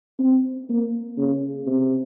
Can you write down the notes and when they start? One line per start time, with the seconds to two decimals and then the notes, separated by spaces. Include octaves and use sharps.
0.19 C4
0.69 A#3
1.17 C#3
1.67 C3